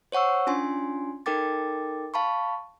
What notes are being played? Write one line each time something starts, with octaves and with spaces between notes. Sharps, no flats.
C5 C#5 F#5 C#6 E6
C#4 D4 F4 G#5 C6
D#4 A4 A#4 G5 D6 A6
F5 A5 B5 C#6